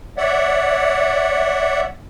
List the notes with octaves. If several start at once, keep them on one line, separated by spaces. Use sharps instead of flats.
C#5 D5 E5 F#5